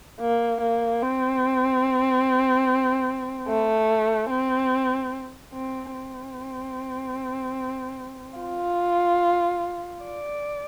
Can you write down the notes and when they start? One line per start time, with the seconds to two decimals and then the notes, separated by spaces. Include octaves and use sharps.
0.21 A#3
0.61 A#3
1.02 C4
3.48 A3
4.30 C4
5.53 C4
5.94 C4
8.40 F4
10.04 D5